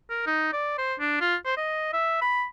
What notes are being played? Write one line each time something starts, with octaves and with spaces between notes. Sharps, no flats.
A#4
D#4
D5
C5
D4
F4
C5
D#5
E5
B5